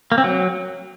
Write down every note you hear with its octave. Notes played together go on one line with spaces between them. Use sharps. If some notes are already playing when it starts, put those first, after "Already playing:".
A#3
C4
F#3